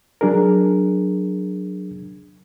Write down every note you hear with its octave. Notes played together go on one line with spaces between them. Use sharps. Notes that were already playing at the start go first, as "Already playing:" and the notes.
F#3 D4 G#4 A#4